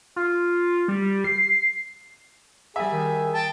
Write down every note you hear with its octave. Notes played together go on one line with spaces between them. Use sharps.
F4
G3
C7
G3 G#4 E5
D#3
G5 A5